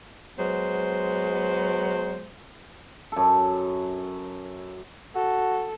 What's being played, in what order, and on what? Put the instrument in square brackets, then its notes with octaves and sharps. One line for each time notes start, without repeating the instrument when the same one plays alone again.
[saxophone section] F#3 G#3 B3 C5
[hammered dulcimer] F#2 A4
[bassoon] F#4 [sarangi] A4